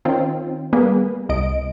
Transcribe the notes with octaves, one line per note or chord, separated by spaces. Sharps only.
D#3 C4 C#4 F4 G5
G3 A#3 B3 G#4 B4
C2 D#5 D7